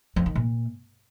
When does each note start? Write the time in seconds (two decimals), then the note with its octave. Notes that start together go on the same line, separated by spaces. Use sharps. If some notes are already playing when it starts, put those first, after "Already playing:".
0.16 F2
0.26 D#3
0.35 A#2